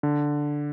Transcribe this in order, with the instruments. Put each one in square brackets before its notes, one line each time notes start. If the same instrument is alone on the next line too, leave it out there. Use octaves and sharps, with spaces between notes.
[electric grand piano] D3